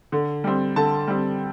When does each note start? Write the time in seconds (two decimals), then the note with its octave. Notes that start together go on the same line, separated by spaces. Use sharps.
0.12 D3
0.44 G3 C4
0.76 D3 A5
1.07 G3 C4